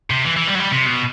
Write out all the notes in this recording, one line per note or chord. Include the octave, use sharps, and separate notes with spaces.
C3
E3
E3
G3
F#3
G3
C3
B2